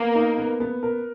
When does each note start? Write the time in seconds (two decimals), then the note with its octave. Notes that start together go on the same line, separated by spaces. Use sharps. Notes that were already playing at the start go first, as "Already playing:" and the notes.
Already playing: A#3 B3
0.15 D#4
0.38 B3
0.60 B3
0.83 A#4